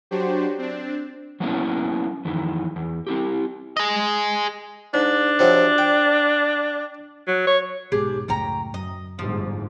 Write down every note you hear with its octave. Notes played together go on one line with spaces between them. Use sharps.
F#3 D4 F#4 G4 C5
C4 D4
F#3 A#3 B3 C#4 D4 E4
F2 D#3 E3
E2
C4 E4 G4
G#4 D#5
G#2 D4
C3 F3 F#3
G5
F#3
C#5
B1 G#2 D4 G4 G#4
C#2 F#2 A2 C#4 G5 A#5
F#2 D#5
G1 G#2 F3